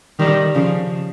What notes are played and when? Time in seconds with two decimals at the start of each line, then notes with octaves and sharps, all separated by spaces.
0.19 D#3 G3
0.55 C#3 F3